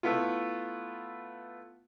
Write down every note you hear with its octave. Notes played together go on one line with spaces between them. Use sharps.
A3 B3 E4 F4